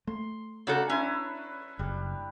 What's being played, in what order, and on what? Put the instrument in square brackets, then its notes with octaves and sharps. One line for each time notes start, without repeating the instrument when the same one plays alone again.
[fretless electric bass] A3 [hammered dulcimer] C6
[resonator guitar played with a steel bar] C#3 F#4 A4 [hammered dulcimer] F#3 D4 A#4
[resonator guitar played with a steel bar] C#4 [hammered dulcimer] D4 E4 B4
[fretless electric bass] F#1 [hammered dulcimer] G3